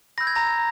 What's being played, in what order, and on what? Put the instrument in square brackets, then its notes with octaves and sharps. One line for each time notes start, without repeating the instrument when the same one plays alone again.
[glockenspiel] B5 E6 G6 A#6
G#6
A#5 A#6